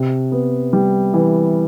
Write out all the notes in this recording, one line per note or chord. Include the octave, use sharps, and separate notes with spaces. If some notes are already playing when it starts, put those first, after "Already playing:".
Already playing: C3
B3
G3
E3